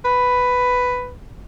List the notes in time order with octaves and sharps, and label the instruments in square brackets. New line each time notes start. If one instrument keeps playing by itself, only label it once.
[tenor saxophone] B4